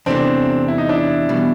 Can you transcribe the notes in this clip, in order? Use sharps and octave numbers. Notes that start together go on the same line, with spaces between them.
E2 C3 E3 A3 C4 D4
E4
D#4
D4 E4
E2 B2 G3